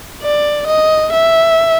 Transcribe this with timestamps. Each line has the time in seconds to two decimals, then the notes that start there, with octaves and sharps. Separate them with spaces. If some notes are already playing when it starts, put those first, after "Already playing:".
0.22 D5
0.68 D#5
1.13 E5